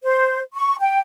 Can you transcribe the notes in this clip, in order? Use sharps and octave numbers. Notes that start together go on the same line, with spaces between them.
C5
C#6
G5